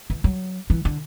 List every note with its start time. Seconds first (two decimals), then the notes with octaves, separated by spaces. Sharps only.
0.10 E3
0.24 F#3
0.70 E3
0.85 D3